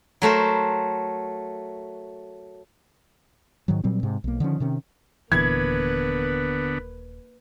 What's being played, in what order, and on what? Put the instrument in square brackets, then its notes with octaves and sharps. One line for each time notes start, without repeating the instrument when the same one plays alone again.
[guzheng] F#3 A3 A#4 C5
[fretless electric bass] G#2 D#3 F#3
A#2 F#3 G3 C4
G#2 C3
B1 A#3
D3 D#3 F3 C#4
C3 D#3 C#4
[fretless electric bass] D#1 A#2 E3 [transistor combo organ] D3 B3 [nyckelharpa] A#3 B4 [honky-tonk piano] G#6